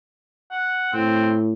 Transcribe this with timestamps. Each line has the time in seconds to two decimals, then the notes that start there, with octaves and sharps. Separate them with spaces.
0.51 F#5
0.93 A2 C4